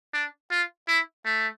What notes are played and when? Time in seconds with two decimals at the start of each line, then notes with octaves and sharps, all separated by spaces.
0.14 D4
0.51 F4
0.88 E4
1.25 A3